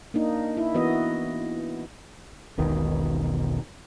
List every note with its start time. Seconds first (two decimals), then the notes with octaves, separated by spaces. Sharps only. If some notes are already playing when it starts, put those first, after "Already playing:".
0.14 A#3 D4 D#4
0.57 E4
0.74 E3 B3 F#4 D#5
2.58 E1 B1 B2 D#3